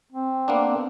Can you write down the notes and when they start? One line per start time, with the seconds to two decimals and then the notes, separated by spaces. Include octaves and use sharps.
0.12 C4
0.48 A#3 B3 D4